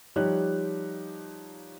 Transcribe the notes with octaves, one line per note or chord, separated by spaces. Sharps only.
F3 G3 D#4 G4 C#5 F#6